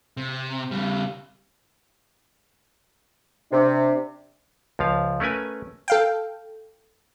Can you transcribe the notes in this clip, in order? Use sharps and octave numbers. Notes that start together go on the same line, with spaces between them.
C3
C#3 G3
C3 D4
C#2 F3 F5
A3 C#4 A#4 B4 G#5
A4 F5 G5